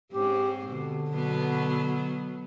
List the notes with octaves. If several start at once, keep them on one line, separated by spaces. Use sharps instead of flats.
G#2 C4 C#4 G4
B2 D3
B2 F#3 B3